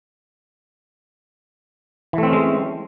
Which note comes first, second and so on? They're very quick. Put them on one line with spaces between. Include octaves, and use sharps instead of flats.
E3 A3 C4 C#4 G#3